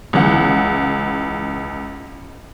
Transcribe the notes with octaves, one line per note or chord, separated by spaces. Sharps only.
C#2 E3 F#5